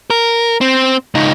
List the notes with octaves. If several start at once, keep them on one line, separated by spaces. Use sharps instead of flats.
A#4
C4
C#2 D#4